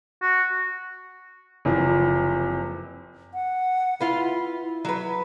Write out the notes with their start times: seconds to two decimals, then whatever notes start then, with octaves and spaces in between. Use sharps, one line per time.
0.22 F#4
1.65 F#1 C3 E3 F3
3.34 F#5
4.01 E4 F4 B4
4.60 E4
4.85 F#3 B4